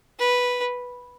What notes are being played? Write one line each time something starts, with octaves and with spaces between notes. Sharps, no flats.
B4